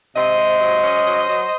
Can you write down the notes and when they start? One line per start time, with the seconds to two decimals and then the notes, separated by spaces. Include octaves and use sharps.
0.16 C3 C5 D#5
0.38 C3
0.61 F#3
0.84 C#4
1.07 F#3
1.29 F#3